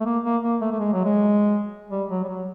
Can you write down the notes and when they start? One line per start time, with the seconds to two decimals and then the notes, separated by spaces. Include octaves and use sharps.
0.01 A3
0.05 A#3
0.24 A#3
0.43 A#3
0.61 A3
0.71 A3
0.79 G#3
0.93 F#3
1.05 G#3
1.91 G3
2.10 F#3
2.24 G3
2.29 F#3